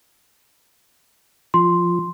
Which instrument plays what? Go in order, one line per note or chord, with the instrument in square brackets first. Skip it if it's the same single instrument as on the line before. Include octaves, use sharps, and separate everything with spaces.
[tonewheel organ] F3 [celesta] C6